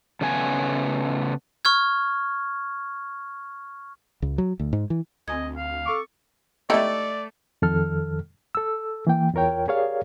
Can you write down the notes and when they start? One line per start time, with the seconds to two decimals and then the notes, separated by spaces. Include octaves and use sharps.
0.21 C#3 A3 B3 G#5
1.65 C#6 F6 G#6
4.22 C#2
4.38 F#3
4.60 D2
4.73 G#2
4.90 E3
5.28 D2 C4 D#5 G#5 G#6
5.57 F5
5.86 A4 C#6 D6
6.70 A3 D#4 E4 G4 A4 D5
7.62 F2 D#3 A4 F6
8.55 A4 E6
9.07 E3 A#3 G5
9.34 E2 F4 A#4 C#5 G5
9.68 G4 G#4 A#4 C#5 D5 F5